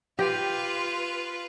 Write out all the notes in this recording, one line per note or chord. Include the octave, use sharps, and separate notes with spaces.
F4 G4 B4